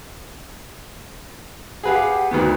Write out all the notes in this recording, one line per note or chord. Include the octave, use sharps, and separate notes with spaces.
G4 G#4 B4 F5 F#5
D2 D#3 B3 B4